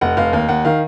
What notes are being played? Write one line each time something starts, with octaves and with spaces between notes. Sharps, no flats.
F1 F#5
F1 F5
D#2 F5
D#2 F#5
D#3 F5